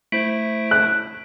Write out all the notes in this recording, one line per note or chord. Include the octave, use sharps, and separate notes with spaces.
A3 E4 C5 B6 D7 F#7
F#6